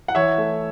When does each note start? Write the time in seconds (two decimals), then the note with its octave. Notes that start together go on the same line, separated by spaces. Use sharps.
0.08 F#5
0.15 E3 C#5 E5
0.38 A3